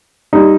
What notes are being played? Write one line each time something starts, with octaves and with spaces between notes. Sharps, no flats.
G3 D#4